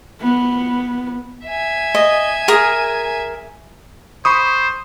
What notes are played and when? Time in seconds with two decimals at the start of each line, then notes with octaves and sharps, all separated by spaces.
0.21 B3
1.46 E5 G#5
1.95 D#5
2.48 G#4 A#4 D#6
4.25 C5 B5 C#6 D#6